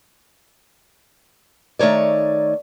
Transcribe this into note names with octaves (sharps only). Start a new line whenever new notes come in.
D#3 A3 D#4 C#5 D5